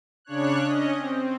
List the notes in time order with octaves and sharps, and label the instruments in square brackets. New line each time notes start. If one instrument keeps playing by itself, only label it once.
[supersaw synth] C#3 D4 C#5 F#6
C#4 D#5
C4